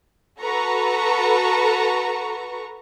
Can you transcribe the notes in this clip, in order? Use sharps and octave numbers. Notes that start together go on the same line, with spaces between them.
F#4 A4 B4 A#5 C#6